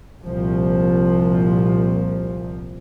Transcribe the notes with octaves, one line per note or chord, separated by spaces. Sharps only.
C2 A#2 F3